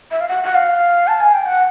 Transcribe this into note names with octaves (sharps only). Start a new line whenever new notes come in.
E5
F5
F#5
F#5
F5
A5
G#5
G5
F#5